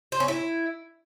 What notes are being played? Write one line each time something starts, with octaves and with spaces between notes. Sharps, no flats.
C5
C#4
E4